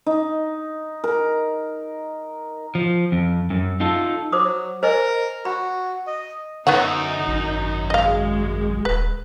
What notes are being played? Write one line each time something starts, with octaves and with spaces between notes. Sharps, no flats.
D#4
A#4
F3
F2
F#2
D#4 F4 A4
F#3 C5 D6 D#6
A#4 C5 D#5 G#5
F#4 B5
D#5
F#2 D3 B3 D#4 C#5 F#5
G#1
G#3 D#5 F5
D#1 B4